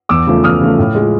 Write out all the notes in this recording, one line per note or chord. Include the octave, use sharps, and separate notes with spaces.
E2 D6 E6
C#3 F3 A3
E2 D#6 F6
C#3 F3 A3
A2
G#3
F3